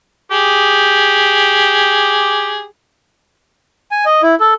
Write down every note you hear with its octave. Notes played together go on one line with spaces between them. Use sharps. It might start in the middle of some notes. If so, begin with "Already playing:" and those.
G4 G#4
G#5
D#5
E4
A4